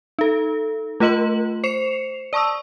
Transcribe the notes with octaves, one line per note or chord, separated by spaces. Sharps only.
D#4 A4
A3 F4 A#4 D#5 C6 F#7
C5 C7 C#7 E7 F7
D5 A5 C#6 D#6 E6